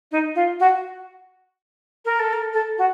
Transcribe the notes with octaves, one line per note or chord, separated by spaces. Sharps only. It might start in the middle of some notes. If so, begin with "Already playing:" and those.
D#4
F4
F#4
A#4
A4
A#4
A4
F#4